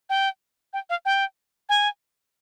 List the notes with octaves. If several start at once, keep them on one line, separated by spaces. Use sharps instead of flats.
G5
G5
F5
G5
G#5